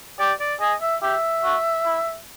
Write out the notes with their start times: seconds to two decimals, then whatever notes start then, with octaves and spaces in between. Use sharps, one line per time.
0.19 G4 D5
0.40 D5
0.61 G#4 D#5
0.81 E5
1.02 G4 E5
1.44 F#4
1.85 E4